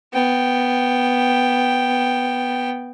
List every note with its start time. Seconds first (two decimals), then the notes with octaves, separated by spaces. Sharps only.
0.13 B3 G5